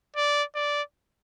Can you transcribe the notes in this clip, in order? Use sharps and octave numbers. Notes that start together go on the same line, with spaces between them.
D5
D5